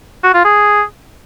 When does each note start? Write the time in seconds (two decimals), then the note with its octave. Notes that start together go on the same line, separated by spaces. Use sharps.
0.23 F#4
0.34 F4
0.44 G#4